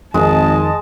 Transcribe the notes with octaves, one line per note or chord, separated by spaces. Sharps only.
G#1 F2 D#3 G#3 D#5 A5